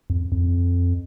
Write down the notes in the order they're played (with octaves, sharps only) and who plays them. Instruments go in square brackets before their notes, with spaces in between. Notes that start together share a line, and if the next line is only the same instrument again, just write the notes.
[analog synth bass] F2
F2